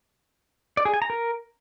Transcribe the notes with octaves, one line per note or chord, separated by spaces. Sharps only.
D5
G#4
G#5
A#5
A#4